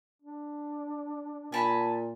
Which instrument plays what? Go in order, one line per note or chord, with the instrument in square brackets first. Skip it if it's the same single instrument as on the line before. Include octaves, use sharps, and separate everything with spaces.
[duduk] D4
[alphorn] A#2 [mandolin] G#5 A5 B5